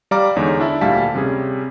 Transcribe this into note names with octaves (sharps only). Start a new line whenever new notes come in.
G3 D5 F5 A#5 D6 F6
E2 D3 G#3 D#4 C#5
D4 E4 E5 A5
D2 A#2 G3 F5 A5 B6
C3 G3 C#4 G#4